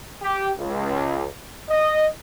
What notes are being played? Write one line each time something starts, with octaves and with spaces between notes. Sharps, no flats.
G4
C#2
D#5